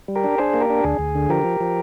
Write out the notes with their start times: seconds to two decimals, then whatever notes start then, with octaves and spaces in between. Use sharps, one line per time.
0.08 G3
0.16 G4 A#4
0.24 D4
0.38 D4 G#4 C5
0.54 A#3
0.61 G4 A#4
0.70 D4
0.84 D2 G#4
0.99 D2
1.15 D3
1.29 F3 G4 A#4
1.44 F3
1.60 F3